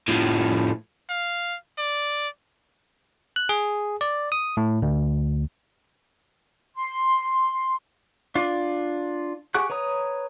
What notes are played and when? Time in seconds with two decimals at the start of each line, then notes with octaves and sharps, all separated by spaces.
0.08 A2 F3
1.10 F5
1.78 D5
3.36 F#6
3.49 G#4
4.01 D5
4.32 D#6
4.57 A2
4.82 D2
6.76 C6
8.35 D4 F4
9.54 G4 G#4 F#5 C#6 F#6
9.70 B4 C#5 A#5 D#6